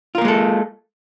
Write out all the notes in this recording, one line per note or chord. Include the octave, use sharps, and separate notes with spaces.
G#3 A#3 F4 A4 A#4